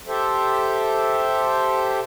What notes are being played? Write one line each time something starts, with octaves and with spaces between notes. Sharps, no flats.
G4 A4 C5 E5